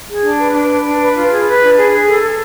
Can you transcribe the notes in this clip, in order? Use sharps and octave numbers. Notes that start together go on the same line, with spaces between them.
G#4
D4
B4
D4
B4
D4
B4
F4
G#4
B4
D4
G#4
G#4
A4
A4